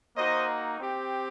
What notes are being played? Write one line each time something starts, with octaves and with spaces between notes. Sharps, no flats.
A#3 D#4 F#4 C5 D#5
C4 G4